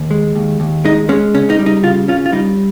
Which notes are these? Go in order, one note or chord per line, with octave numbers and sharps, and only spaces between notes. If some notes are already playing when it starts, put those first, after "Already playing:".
Already playing: D#2
G#3
D#2
D#2
G#3 D#4
G#3 C#4
C#3 C#4
D#4
G3
D#4
C#3 F4
C#4 F4
F4
G3 D#4